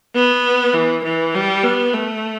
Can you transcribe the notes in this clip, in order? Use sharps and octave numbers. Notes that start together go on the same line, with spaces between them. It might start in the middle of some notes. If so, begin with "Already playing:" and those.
B3
E3
E3
G3
B3
A3